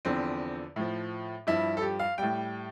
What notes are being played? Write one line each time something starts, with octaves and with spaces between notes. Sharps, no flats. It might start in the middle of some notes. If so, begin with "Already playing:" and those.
E2 D3 F3 C4
A2 F3
G2 F3 E4
A4
G4
F5
A2 G3 G5